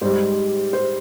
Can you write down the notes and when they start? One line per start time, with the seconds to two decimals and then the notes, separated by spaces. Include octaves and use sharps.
0.01 G#2 G3 C5
0.73 C5